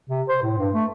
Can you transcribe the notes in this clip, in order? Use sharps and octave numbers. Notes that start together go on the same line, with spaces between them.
C3
C5
A2
G2
A3